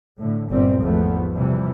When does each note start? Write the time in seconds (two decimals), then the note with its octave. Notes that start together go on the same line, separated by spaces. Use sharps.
0.18 A2 D3
0.50 G1 A#2 G3 C4
0.82 G#1 E2 F3 A3 B3
1.33 C3 E3 F3 G3